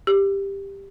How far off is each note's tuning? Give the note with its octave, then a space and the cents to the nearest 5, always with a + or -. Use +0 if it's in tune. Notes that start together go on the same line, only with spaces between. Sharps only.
G4 +10